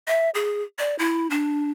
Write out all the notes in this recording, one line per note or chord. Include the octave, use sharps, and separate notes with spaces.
E5
G#4
D5
E4
D4